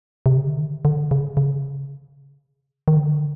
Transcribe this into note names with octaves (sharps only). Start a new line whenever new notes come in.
C3
C#3
D3
D#3
D3
C#3
C#3
D#3
D3